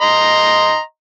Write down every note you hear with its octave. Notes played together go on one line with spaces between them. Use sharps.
D#5 A#5 C6